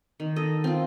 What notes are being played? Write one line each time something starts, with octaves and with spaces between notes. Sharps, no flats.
D#3
A4 D#5
C4 F4